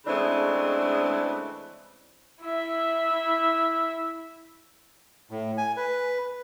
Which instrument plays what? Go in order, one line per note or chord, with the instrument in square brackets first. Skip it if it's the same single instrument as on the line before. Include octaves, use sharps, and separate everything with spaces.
[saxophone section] C#3 E3 G#3 A3 C4 D4
[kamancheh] E4 E5
[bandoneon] A2
G#5
B4